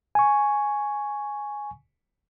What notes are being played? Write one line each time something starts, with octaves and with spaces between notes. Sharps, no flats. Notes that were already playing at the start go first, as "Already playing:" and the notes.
G#5 C#6